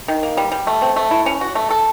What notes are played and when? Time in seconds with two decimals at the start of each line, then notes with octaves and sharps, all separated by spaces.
0.08 D#3
0.23 A#3
0.37 G3
0.52 G3
0.67 A3
0.82 C4
0.96 A3
1.11 E4
1.26 C#4
1.41 F#4
1.55 A3
1.70 A4